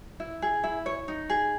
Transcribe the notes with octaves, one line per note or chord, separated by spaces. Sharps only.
E4
G#4
E4
C#5
D#4
G#4